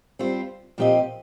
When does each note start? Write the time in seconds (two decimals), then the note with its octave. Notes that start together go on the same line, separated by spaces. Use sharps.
0.19 G3 C4 F4 C5
0.78 A#2 F3 C4 G4 D#5